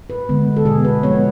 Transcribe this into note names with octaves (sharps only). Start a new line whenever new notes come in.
B4
D3 G#3 B3
A4
B2 G#3 B3 G#4
B4
F3 G#3 B3 C#5